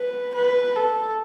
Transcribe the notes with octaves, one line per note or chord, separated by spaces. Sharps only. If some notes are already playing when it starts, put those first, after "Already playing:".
Already playing: B4
B4
A4